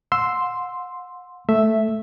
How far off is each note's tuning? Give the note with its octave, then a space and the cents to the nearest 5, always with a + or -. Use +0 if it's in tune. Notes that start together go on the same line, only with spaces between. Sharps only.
F#5 -40 C6 +0 E6 +0
A3 +0 E5 +0